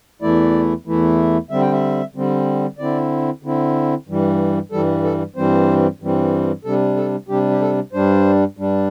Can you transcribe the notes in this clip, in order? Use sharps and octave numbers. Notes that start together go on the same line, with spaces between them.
E2 E3 A3 E4 D5
E2 E3 A3 E4
D3 G3 C4 E5
G5
E5
D3 G3 C4
D3 C4 E4 D5
D3 C4 E4
G2 E3 G3
G2 E3 G3 A4
A4
G2 E3 G3 C4 C5
G2 E3 G3 C4
C3 G3 D4 A4
A4
C3 G3 D4 G4
G4
A4
G2 G3 D4 C5
G2 G3 D4